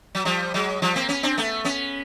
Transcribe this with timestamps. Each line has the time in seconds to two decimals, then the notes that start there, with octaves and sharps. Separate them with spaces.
0.15 F#3
0.25 F3 G3
0.54 F#3 G#3
0.82 F3 G3
0.96 A#3 C4
1.09 B3 C#4
1.23 C4 D4
1.37 A3 B3
1.65 B3 C#4